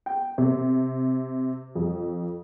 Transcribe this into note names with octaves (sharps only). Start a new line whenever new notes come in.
G5
C3
F2